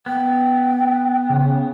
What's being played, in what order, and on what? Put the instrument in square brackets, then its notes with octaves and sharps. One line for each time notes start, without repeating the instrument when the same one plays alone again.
[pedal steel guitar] B3 [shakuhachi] G5
[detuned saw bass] C#3